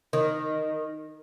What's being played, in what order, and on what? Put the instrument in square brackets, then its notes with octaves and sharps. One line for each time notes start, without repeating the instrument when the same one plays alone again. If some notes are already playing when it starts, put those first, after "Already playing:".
[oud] D#3